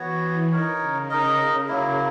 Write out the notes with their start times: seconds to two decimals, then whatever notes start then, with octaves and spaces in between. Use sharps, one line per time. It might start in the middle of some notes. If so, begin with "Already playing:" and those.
Already playing: E3 B3 F#4 C#5
0.51 D#4 A#4 C#5
0.80 C#3
1.10 D#4 A#4 D#5
1.68 F#3 A#3 E4